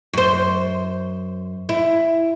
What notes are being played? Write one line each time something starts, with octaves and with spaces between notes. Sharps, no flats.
F#2 C5
E4